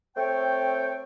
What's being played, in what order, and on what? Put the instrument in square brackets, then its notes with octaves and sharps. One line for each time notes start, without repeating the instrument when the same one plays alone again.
[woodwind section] A3 C4 C#5 G5